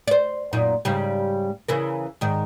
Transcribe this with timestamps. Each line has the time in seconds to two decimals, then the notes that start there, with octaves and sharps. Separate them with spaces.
0.07 C5 D5
0.53 F#2 A#2 D#4
0.85 G#2 C#3 G3
1.69 C#3 E3 A#4
2.21 G#2 D#3